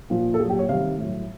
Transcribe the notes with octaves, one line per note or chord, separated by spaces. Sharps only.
A#2 F3
A4
A#2 F#3 G#4
G4
C#5
C3 D#3 G3 F5
A2 F#3